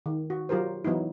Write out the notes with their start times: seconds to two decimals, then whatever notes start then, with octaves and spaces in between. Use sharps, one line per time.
0.06 D#3
0.30 F#4
0.49 F#3 F4 G4 A#4 C5
0.84 E3 F#3 B3 D#4 E4